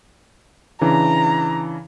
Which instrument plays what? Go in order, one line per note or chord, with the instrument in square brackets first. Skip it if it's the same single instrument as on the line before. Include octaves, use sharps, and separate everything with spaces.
[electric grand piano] C#3 E3 D4 [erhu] A#5